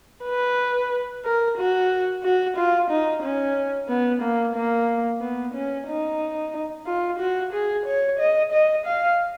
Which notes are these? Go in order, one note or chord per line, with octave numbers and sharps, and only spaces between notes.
B4
A#4
F#4
F#4
F4
D#4
C#4
B3
A#3
A#3
B3
C#4
D#4
F4
F#4
G#4
C#5
D#5
D#5
F5